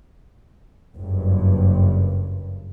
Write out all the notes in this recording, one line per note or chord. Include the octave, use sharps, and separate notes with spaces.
F#1 G2